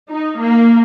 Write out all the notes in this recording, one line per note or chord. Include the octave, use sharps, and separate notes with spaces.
D#4
A#3